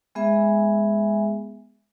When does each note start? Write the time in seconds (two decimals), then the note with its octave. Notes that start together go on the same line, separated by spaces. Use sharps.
0.15 G#3 B3 G#4 E5 G#5